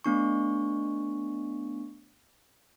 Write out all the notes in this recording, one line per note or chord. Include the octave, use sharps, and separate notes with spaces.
A3 B3 D4 C#6